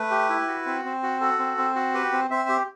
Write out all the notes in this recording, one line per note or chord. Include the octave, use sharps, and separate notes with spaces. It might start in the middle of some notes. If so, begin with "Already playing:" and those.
Already playing: A3 B4
G4
E4
F#4
C4
C4
F#4
F#4 A4
C4
C4
F#4
G4 B4
C4
C4 C5 E5
G4